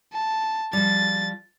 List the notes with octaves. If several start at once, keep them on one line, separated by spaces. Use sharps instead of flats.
A5
F3 G3 A6